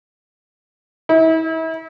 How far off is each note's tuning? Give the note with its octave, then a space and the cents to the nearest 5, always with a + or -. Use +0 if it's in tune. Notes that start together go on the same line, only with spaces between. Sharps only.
E4 -40